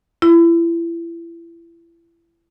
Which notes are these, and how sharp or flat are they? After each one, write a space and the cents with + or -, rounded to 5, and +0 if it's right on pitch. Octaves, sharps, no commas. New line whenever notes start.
E4 +30